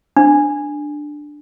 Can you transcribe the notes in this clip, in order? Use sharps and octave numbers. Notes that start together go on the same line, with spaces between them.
D4